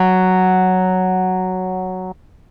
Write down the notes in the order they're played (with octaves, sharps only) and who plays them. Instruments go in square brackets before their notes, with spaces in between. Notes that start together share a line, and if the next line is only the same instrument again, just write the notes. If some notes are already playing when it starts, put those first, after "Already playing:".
Already playing: [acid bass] F#3